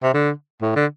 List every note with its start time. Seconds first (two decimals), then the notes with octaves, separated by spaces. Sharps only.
0.03 C3
0.14 D3
0.62 A2
0.76 D3